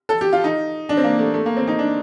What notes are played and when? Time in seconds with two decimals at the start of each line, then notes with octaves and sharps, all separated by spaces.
0.09 A4
0.21 G4
0.32 F4
0.44 D#4
0.89 D4
0.97 C4
1.04 A#3
1.19 A3
1.34 A3
1.46 A#3
1.57 C4
1.67 D#4
1.79 D4